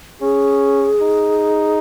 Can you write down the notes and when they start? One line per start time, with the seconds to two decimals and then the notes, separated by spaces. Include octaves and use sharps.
0.21 C#4 G#4
1.01 D#4